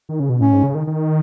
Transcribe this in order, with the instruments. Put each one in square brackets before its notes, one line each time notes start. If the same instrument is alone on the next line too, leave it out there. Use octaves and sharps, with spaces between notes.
[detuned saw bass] D#3
C#3
B2
[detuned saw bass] A2 [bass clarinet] C#4
[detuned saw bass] G#2
C#3
D#3
D#3